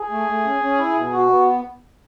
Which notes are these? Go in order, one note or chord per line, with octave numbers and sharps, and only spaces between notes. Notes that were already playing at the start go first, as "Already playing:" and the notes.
Already playing: G#4
A3
A3
C#4
C#4
E4
B2
F#4
B3